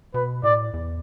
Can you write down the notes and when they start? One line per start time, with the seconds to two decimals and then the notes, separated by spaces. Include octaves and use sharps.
0.14 B2 B4
0.43 A2 D5
0.74 E2